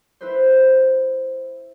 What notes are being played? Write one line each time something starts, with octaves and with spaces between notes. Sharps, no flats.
E4 B4 C5